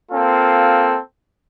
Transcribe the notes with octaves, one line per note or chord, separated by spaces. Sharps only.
A#3 C4 F4 A4